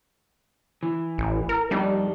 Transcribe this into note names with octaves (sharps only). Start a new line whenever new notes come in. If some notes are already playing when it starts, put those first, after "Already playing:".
E3
A1
A#4
F2 G3 D4 D#4